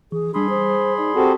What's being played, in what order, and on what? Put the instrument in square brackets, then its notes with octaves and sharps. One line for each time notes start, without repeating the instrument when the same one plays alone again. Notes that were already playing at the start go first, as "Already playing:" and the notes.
[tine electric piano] E3 [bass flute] G#4
[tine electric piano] G3 D#6 [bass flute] D4 [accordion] G#4 B5 C6
[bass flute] C5
[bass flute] D#4 [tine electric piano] D5
[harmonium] C4 F#4 A4 [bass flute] G4